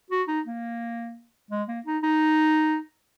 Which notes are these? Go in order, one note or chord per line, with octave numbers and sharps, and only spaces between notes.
F#4
D#4
A#3
G#3
A#3
D#4
D#4